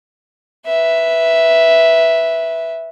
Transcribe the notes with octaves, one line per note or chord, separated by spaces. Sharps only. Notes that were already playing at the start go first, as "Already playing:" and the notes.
B4 E5